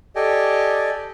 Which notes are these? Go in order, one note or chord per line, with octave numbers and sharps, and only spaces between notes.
G4 A4 D5 D#5 G5 G#5